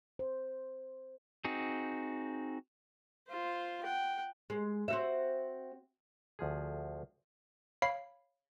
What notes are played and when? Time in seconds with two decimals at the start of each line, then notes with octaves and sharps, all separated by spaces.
0.19 C5
1.45 C4 D#4 F#4 G#4
3.29 F4 C5
3.83 F#5 G5
4.50 G#3
4.88 C4 F#4 E5
6.39 D2 F3 G#4
7.82 C#5 F5 B5 C7